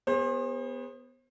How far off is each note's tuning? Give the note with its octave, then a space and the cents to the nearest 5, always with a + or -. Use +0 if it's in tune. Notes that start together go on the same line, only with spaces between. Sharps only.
B3 +0 G#4 -35 C5 +35